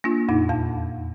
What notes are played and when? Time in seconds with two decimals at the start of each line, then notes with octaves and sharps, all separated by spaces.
0.04 A#3 D4 F4
0.29 F2 A#2 D#4
0.49 E2 A5